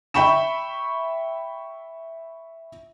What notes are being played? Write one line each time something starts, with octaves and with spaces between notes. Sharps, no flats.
E5 G5 B5 C#6 E7